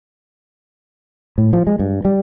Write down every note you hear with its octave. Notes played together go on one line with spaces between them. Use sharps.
A2
F3
G#3
G2
G3